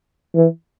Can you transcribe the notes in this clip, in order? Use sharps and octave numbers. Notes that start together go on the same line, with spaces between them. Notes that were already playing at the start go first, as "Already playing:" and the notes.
E3